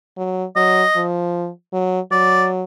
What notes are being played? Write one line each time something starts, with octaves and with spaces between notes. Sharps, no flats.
F#3
F#3 D#5
F3
F#3
F#3 D5